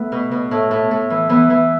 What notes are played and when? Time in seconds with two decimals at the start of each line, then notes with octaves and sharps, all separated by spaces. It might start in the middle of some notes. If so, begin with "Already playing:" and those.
Already playing: A3 B3
0.12 B2
0.31 B2
0.51 A2
0.71 A2
0.91 A2
1.10 E3
1.29 E3 B3
1.50 E3